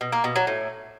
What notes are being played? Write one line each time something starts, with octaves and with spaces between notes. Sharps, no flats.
B2
A#3
B2
F#3
A2